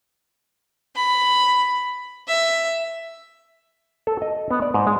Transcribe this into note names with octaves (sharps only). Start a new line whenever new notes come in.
B5
E5
A4
D#5
B3
D5
G#2
G#3